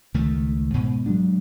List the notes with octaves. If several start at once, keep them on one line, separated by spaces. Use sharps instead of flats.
C#2 D#3 A3
G#2 B2
F#3 G#3 D4